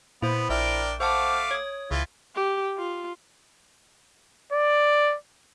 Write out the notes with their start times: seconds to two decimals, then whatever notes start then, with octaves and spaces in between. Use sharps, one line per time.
0.22 A#2 B3 E4 C5
0.50 A#1 D4 A#4 E5 G5
1.00 A3 C5 F5 F#5 A5 D6
1.51 C#5 D#6 G#6
1.91 C#2 E3 F4
2.36 G4
2.78 F4
4.52 D5